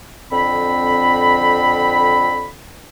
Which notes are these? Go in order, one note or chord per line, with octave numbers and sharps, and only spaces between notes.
F2 D3 C4 B5